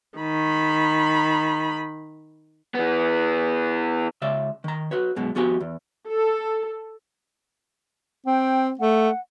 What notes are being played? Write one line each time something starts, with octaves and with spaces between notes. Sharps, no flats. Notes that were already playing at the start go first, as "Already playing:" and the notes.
D#3 B5
E3 B3
C#2 C#3 D5 E5
D#3 A#5
F#4 B4 C#5
F#2 B2 G#3
F2 B3 F#4 G4 G#5
E2
A4
C4 G5
A3 F#5